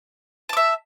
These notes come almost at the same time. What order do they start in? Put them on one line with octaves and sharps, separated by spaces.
A5 D6 E5